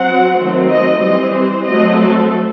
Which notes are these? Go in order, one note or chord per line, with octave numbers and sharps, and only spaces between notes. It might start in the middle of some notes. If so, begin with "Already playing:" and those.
Already playing: F#3 C4 F#5
D#3 F#3 A3 C4
D#5
E3 G3 C4 D#5
C5
F#3 A3 C4 D#5
A4